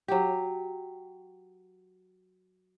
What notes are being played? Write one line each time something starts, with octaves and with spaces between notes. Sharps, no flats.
F#3 G4